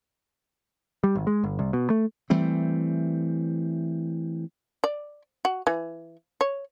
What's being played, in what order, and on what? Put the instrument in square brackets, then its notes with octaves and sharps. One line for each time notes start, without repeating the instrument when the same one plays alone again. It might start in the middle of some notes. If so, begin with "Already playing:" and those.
[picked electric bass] G3
G#1
G#3
G1
C2
B2
A3
[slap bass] E3 G3 A3 C4
[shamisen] D5
F#4
E3
C#5